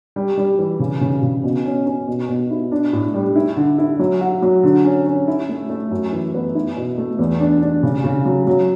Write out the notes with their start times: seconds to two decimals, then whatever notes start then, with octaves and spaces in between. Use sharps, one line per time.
0.16 G3
0.37 G3
0.59 E3
0.80 C#3
1.01 C#3
1.22 C#3
1.44 B2
1.66 C#4
1.86 C#4
2.08 B2
2.29 B2
2.50 E4
2.72 D4
2.93 A2
3.14 G3
3.35 E4
3.56 D3
3.78 E4
3.99 F#3
4.21 F#4
4.42 F#3
4.63 D3
4.85 C#4
5.06 C#4
5.28 E4
5.49 A3
5.70 A3
5.91 F#2
6.13 E3
6.34 B3
6.55 E4
6.77 B2
6.98 A3
7.19 E2
7.40 D4
7.62 D4
7.83 C#3
8.04 C#3
8.25 F#3
8.47 F#3